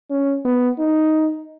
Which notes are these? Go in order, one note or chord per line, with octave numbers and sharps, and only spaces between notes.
C#4
B3
D#4